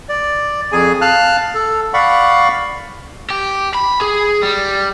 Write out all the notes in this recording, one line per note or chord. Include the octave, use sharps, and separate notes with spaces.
D5
F2 G#4 G#5
F5 A5 F6 F#6
A4
D5 F5 F#5 B5 C#6
G4
B5
G#4
G3